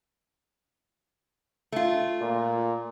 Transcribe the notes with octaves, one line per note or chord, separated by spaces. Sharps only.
A3 F4
A#2